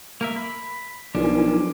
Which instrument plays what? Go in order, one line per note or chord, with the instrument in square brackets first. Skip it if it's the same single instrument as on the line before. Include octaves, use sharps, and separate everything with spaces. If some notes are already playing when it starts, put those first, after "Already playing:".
[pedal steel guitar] A#3 A#4 E5
B5
[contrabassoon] B1 [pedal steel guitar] F3 D4 [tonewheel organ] E4 A#4 G#5